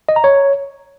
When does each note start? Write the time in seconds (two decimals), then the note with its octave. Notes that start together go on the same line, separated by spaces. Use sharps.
0.09 D#5
0.16 A#5
0.24 C#5